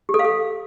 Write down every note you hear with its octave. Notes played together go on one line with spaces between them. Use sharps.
G4
A4
F5
A4